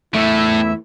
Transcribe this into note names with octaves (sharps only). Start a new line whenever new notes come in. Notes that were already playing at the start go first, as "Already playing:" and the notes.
E2 A2 E3 A3 E4 E5